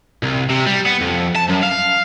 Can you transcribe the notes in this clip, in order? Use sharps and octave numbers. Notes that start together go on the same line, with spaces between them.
C2
C3
G3
B3
F2
A5
F#2
F5